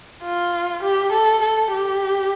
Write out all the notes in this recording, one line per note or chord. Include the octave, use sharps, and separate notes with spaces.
F4
G4
A4
A4
G4